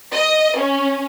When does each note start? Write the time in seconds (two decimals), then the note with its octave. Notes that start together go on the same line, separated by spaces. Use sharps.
0.13 D#5
0.58 C#4